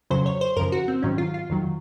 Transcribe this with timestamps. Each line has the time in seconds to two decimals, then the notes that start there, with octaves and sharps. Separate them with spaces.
0.10 F2 C#3 F#3 C5
0.26 C#5
0.41 C5
0.57 F#2 C#3 F3 A#4
0.72 F#4
0.88 C4
1.03 G#2 D#3 F#3 C#4
1.18 F4
1.34 F4
1.50 F2 D#3 F#3